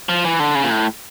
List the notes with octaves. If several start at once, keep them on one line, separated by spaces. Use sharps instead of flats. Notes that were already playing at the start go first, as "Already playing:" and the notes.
F3
E3
D3
C#3
A#2
A2